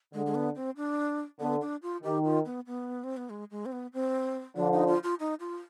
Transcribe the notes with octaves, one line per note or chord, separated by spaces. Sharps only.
D3 G#3
G#3
B3
C4
D4
D3 B3
D4
F4
D#3 G4
F4
B3
B3
C4
B3
G#3
G#3
C4
B3
C4
D3 F3 D4
D#4
F4
F4
D#4
F4